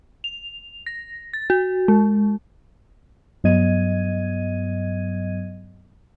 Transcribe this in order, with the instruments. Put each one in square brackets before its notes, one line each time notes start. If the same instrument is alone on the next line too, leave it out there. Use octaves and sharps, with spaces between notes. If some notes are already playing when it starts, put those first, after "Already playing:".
[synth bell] F7
A#6
A6
F#4
G#3
[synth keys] G2 F#3 B3 D#5 G#6 D#7